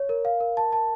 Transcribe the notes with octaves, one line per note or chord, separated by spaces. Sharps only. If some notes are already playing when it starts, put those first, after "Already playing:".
Already playing: C#5
A#4
F5
A#4
A5
A5